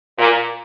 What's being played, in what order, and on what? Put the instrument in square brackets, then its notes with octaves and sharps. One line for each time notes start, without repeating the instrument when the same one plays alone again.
[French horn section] A#2